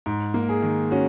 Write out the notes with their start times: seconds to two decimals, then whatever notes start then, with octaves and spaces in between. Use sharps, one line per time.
0.06 G#2
0.34 A#3
0.49 G#4
0.62 D#3
0.91 C#4 F#4